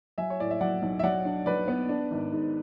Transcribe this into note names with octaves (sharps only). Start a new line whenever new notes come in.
F#3 E5 G#5
C#5
A2 D5
E5
F#3 D5 F#5
B1
E5
F#3 D5 F#5
D4
F#3 B4 D5
B3
D4
G#1
G#2